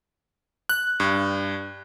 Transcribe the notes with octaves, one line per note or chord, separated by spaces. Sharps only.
F#6
G2